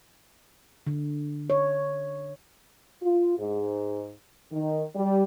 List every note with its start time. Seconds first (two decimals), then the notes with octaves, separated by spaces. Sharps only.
0.87 D3
1.50 C#5
3.02 F4
3.38 G#2
4.52 D#3
4.95 G3